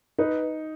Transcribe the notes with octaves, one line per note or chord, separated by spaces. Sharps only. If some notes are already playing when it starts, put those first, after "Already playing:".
D#4 B4